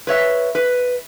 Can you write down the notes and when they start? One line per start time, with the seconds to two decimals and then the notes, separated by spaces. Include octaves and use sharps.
0.07 B4 C#5 E5
0.55 B4